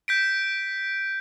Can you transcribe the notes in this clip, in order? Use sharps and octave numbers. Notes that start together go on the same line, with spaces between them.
G6 B6 D7